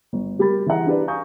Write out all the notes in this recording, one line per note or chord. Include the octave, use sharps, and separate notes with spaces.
G1
G3 G4 A#4 B5 A6
E3 E4 G#4 F#5 A#5
D4 E4 G4 B4 D5
F5 G#5 A#5 C#6 D#6 G6